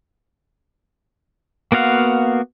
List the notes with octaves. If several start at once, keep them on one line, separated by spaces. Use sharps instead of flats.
A#3 B3 F#4 F5 F#5